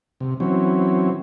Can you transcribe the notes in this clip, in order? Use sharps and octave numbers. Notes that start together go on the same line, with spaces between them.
C3
E3 F#3 C4 C#4